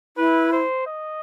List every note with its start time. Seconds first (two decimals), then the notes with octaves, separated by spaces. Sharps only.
0.17 E4 B4
0.52 C5
0.87 D#5